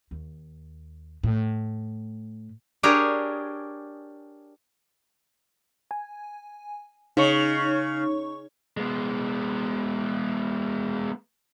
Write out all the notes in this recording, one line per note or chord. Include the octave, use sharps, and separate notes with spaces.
D#2
A2
D4 G4 G#4 A#4 C#5
G#5
C#3 D#4 C#5 C#6
G#3 B3